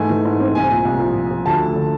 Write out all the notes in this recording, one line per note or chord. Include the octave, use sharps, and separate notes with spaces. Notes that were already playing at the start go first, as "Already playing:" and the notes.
Already playing: G#2 E3 A3 G#5
E3
G#2
C4
C2 G#5
A#2
C2
F3
A#2
F3
D2 A5
A3
D3